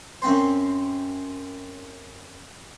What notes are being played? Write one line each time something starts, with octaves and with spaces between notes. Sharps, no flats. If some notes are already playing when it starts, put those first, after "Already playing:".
F#2 C4 C5